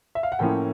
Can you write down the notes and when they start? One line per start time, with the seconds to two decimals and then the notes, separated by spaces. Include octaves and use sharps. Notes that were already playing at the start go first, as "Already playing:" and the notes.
0.15 E5
0.23 F5
0.32 F#5
0.39 A2 F3 A#3 C#4 E4 G5